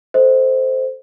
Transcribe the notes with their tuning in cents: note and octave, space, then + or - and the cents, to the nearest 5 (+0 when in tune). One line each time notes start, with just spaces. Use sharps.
A4 +0 C5 -10 D#5 +40